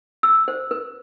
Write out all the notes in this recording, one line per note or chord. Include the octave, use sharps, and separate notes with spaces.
E6
C5
B4